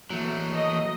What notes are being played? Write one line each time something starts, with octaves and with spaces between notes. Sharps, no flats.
E3 F#3 A3 A#3 F#4
D#5